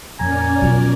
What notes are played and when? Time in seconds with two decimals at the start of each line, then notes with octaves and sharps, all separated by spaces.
0.19 F2 A#2 C#4 A#4 D5 G#5 A#5
0.62 B2 F3 F#3